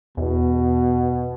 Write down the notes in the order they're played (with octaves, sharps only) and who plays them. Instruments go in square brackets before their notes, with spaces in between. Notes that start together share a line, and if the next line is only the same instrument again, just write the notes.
[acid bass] E2 [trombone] B2